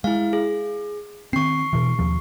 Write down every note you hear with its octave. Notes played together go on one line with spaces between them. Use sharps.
G#3 E4 F5
G#4
D#3 C4 C#6 C7
B2 E3
D#2 F3